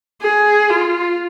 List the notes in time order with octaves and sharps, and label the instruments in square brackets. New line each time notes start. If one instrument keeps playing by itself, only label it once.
[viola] G#4
F4